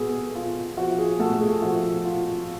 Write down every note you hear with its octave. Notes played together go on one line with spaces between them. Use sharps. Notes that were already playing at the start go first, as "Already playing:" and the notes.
Already playing: B3 F#4 G#4 A4
F4
F3 F#4
G#4
A3 F#4 A4
G#4
F3 F#4
F4